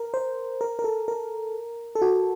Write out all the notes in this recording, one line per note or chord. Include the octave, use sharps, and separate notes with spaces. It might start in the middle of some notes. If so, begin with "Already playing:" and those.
Already playing: A#4
C5
A#4
A#4
A4
A#4
A4
F#4